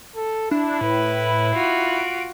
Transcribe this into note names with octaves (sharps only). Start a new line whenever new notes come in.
A4
D4 E4
A2 B4
F4 F#4
D7